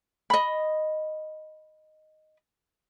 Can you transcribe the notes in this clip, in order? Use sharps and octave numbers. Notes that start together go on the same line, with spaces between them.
D#5 B5